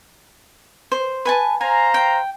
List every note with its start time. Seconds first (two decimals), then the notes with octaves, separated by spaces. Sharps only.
0.92 C5
1.25 B4 G#5 A5
1.61 C5 F5 G#5 A#5
1.94 G5